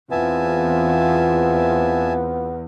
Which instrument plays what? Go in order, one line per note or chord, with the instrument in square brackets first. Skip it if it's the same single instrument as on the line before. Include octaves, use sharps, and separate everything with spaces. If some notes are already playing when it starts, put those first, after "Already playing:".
[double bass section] E2 [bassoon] B3 [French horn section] C4 F4 [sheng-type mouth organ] E5 G#5 A5